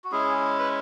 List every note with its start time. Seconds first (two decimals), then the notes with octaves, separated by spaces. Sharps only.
0.04 F#4
0.12 G#3 C#4 E4 G#4
0.59 B4